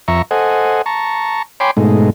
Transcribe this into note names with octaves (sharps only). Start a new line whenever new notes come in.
F2 E5 A#5 C#6
A4 C5 D#5 F#5 G#5
A5 A#5 C#6
C#5 G5 G#5 B5 C6 D6
G#2 B2 G#3 A3 D#4